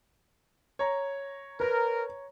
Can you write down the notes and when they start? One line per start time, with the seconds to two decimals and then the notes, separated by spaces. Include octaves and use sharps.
0.79 C#5 A#5
1.60 A#4 B4